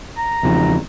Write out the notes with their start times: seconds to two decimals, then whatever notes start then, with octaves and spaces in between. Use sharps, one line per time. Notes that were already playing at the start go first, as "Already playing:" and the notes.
0.17 A#5
0.43 G#1 E2 C#3 F3